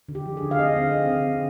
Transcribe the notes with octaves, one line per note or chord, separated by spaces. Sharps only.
D3
G4
F3
G#4
D3
F5
C4 D#5
C4
C4
D3
D3